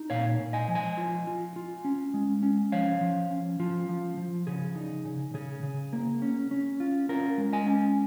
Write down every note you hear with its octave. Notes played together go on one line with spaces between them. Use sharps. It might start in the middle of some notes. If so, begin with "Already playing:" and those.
Already playing: D#4
A#2 C#5 F5
A#2
D#5 G#5
F3
D#5 G#5
F4
F4
F4
C#4
G#3
C#4
F3 C#5 F5
F3
C#4
F3 F4
F3
F3
C#3 G#4
D#4
C#3
C#3 G#4
C#3
A#3
C#4
C#4
F4
C#4 F4 A#4
G#3
D#5 G#5
C#4